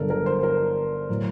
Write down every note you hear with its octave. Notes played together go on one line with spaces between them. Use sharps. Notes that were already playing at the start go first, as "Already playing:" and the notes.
Already playing: G1 G2 D3 F#3 A4 A#4
A#4
C5
A#4
A2 F#3